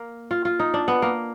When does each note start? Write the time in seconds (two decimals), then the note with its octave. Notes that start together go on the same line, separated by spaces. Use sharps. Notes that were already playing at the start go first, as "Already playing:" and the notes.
Already playing: A#3
0.31 F4
0.45 F4
0.60 D#4
0.74 D4
0.88 B3
1.02 A#3